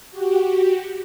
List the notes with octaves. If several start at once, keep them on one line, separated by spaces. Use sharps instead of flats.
F#4 G4